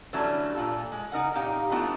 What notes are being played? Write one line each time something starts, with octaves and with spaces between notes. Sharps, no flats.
D3 E3 F#3 G3 A3 C#4
A#2 F4 A4
G#3
C#3 D#4 A#4 F#5
A#2 D#4 G4 F5 G5
E3 A3 B3 D4 D#4 F4